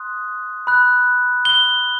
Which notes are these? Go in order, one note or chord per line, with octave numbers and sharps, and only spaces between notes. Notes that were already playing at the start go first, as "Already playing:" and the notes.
Already playing: C6 D#6 F#6
B5 F#6
G7